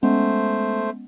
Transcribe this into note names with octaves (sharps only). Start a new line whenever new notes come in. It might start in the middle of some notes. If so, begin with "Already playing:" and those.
G#3 A3 B3 C#4 C5